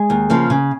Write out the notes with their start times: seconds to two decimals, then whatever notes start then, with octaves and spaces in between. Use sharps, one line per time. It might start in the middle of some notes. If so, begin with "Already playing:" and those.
Already playing: G#3 G#4
0.10 D#2
0.30 C#3 F3 A#3
0.50 C#3